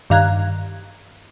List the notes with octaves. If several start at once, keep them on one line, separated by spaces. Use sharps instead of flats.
G2 D#3 F5 A#5 F#6 G#6